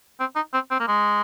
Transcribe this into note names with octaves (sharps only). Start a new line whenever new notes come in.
C4
D#4
C4
C4
A#3
G#3